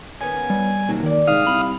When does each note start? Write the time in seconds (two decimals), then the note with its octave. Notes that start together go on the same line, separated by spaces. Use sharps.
0.21 D#3 B3 C#4 G#5
0.50 G3
0.88 D#2 C3 F3 F#3
1.03 F2 D#3 D5
1.27 G#2 C3 G3 F5 D#6 F6
1.47 C2 B5